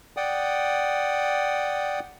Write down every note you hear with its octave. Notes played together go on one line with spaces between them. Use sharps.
D5 F#5 G5 D#6